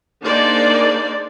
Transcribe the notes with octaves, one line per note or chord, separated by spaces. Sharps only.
A#3 D4 D#4 G#4 C5 D5